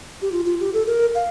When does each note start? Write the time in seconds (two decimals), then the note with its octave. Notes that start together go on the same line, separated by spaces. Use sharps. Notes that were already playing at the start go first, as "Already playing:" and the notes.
0.22 G4
0.32 F4
0.45 F4
0.60 G4
0.73 A4
0.87 A#4
1.15 F5